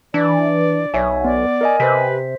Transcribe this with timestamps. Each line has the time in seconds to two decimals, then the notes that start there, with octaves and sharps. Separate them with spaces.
0.14 E3 D4 D5
0.94 B1 C#5 E5 G#5
1.24 B3 D5
1.61 A#4 D#5 G#5
1.80 C3 B4 C5 B6